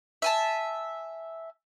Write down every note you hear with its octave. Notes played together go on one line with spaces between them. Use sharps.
E5 G#5 A5